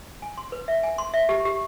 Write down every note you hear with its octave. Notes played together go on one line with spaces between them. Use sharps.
G#5
C6
B4
E5
G#5
C6
E5
G4
G4